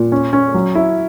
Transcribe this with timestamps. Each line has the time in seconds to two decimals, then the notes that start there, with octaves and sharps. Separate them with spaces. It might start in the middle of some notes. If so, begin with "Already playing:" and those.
Already playing: A#2
0.12 C#4
0.33 C#4
0.54 F#3
0.75 E4